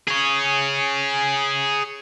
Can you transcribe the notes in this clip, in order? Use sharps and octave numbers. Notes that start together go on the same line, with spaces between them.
G#4 C#5